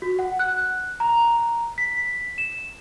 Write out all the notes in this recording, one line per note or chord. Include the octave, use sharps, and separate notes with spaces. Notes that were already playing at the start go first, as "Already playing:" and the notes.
F#4
F#5
F#6
A#5
B6
E7